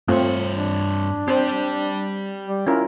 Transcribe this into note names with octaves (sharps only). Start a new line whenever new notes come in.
G2 A3 C4 F4 C#5
D4
C4 G4 C5 D5
G3
C#4 E4 F4 A#4